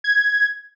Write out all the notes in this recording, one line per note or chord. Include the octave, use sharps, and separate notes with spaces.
G#6